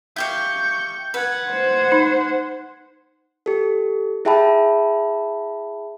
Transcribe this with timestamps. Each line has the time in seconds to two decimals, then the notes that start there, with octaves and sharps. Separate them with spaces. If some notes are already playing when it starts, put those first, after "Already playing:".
0.16 E4 G4 F5 C#6 G6
1.14 B4 F#5 G#6
1.50 C5
1.92 D#4
3.46 G4 A4
4.25 E4 G#4 E5 G5 A5 B5